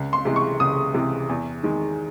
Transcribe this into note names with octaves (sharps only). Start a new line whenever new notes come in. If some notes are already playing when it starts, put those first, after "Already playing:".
Already playing: C#2
C6
C3 E3 G#3
C#6
C#2 D#6
C3 E3 G#3
E2
D#3 G#3